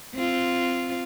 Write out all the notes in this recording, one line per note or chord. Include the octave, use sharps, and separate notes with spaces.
C4 F4